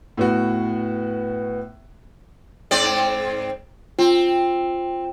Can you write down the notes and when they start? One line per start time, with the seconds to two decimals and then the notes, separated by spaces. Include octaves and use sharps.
0.17 A2 B3 F#4
2.71 G#2 C4 D5
3.99 C4 F4